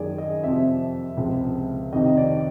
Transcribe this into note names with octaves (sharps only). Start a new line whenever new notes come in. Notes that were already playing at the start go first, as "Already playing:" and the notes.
Already playing: F#2 D#3 G#3 G#4 D5
D#5
F2 C3 F3 E5
C#2 C3 F3 G#3
F2 C3 D#3 D#5
D#5
D5